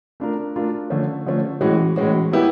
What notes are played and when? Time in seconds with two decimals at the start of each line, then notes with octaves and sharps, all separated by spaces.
0.20 A3 D4 F4 A#4
0.56 A3 D4 F4 A#4
0.90 D3 F3 A3 C#4
1.26 D3 F3 A3 C#4
1.61 A2 E3 G#3 C#4 F#4
1.96 A2 E3 G#3 C#4 F#4
2.31 F#3 B3 E4 G4 B4